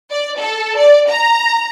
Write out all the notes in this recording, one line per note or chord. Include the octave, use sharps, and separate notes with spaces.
D5
A4
D5
A#5